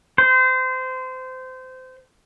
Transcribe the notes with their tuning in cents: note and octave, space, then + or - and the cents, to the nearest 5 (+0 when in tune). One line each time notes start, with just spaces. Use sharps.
C5 -25